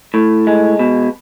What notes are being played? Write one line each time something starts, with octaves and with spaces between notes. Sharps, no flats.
A2
G#3
B2